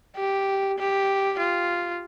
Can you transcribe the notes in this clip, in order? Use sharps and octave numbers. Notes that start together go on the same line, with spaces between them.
G4
G4
F4